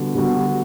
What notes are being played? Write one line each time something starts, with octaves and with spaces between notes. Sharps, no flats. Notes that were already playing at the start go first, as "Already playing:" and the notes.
Already playing: D3 G3 B3 F#4
D3 G3 B3 F#4